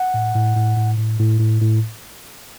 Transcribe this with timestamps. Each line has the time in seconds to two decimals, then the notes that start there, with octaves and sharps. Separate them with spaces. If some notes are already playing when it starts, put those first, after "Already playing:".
Already playing: F#5
0.14 A2
0.35 A2
0.56 A2
0.77 A2
0.98 A2
1.19 A2
1.40 A2
1.61 A2